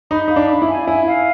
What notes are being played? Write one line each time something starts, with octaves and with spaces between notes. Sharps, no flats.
D#4 B5
D#4 F5
D4
B5
E4
G#5
E4 G#5
F5